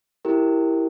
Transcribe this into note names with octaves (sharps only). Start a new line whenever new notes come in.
E4 G4 A#4